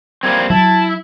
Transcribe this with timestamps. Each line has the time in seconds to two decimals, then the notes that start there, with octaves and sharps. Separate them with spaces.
0.23 G3 A#3 C4 G#6
0.50 F#3 E4 A5